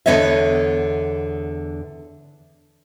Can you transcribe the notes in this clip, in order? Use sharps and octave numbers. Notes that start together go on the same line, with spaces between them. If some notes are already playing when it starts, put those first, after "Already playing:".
E2 D3 B3 C#5 D#5 E5